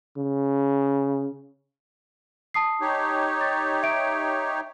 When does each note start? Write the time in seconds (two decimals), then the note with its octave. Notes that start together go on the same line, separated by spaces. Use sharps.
0.18 C#3
2.54 A5 D#6 C7
2.81 D#4 G4 C#5
3.41 A6
3.83 E5 D7